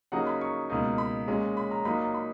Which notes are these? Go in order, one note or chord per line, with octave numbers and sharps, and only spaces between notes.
C#3 F#3 A#3 D#4 F#5
B5
C#6
C#2 B2 A#3 D#4
B5
A#2 G#3 C#4
B5
A#5
A#2 F#3 A#3 D#4 B5
B5